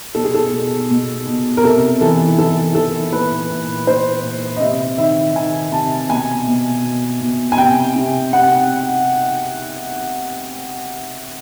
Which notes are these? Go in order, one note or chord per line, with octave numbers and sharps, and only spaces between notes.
B2 A4
G#4
A4
B2
B2
B2
A#4
C3 A4
E3 A4
E3 A4
E3 A4
A#2 B4
A#2
A#2 C5
A#2
D#5
C3 E5
D#3 E5
D#3 G#5
C3 A5
B2 G#5
B2
B2
B2
G#5
C3 G5
C3
C3 F#5